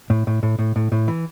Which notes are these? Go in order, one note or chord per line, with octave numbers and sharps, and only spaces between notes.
A2
A2
A2
A2
A2
A2
E3